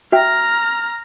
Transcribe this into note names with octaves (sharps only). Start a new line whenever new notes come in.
F#4 E5 G5 A#5 F6